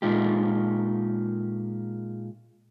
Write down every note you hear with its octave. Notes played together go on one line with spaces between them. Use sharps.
A#2 G#3 D#4 F4 G4